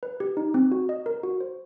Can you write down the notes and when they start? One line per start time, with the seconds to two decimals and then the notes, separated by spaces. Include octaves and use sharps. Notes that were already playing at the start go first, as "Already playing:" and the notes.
0.03 B4
0.20 G4
0.37 D#4
0.54 C4
0.72 F#4
0.89 D#5
1.06 A#4
1.23 F#4
1.41 C5